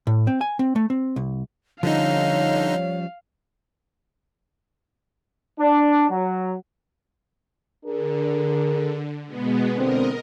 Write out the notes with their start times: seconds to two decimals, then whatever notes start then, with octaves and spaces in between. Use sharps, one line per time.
0.07 A2
0.27 C4
0.41 G#5
0.59 C4
0.76 A3
0.90 C4
1.16 C2
1.83 D3 F3 G3 C#4 D#4 C#5 F5
5.58 D4
6.10 F#3
7.85 D3 D4 G#4 A#4
9.26 B2 G#3 B3
9.77 D3 E3 C4 A#4 D#5